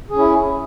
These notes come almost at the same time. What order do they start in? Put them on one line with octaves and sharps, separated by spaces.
G#4 C#4 E4